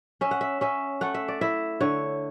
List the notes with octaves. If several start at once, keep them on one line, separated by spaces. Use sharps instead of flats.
C#4 E5
F#5
E5
C#4 E5
A3 F#5
E5
D5
E4 E5
D3 C#5